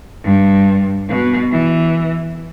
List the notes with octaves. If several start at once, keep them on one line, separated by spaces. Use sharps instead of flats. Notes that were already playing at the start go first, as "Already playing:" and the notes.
G2
B2
E3